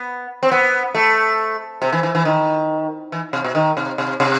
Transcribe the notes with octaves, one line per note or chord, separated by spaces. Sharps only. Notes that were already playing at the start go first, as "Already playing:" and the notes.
Already playing: B3
C4
B3
A3
C3
E3
E3
E3
D#3
E3
C3
B2
D#3
C3
C3
C3